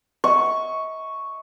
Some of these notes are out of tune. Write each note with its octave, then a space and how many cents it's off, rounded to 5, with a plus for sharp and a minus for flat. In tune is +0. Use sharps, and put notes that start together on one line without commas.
D#5 +45 C#6 +0